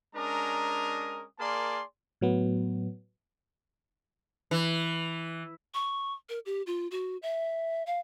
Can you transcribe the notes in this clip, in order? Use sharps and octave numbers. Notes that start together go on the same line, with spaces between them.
G#3 C#4 D4 A#4 A#5 D#6
A#3 G#4 A#4 D5 A5 C6
A2 F#3 B3
E3
C#6
A#4
G4
F4
F#4
E5
F5